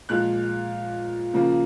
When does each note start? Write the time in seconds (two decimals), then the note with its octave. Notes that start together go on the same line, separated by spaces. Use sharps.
0.09 A#2 F3 G#3 F#6
1.34 C#3 F3 A#3